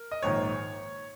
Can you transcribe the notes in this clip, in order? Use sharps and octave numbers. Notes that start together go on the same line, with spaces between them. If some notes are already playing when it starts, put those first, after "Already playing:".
Already playing: A#4
D#5
A#1 G#2 D#3 C#5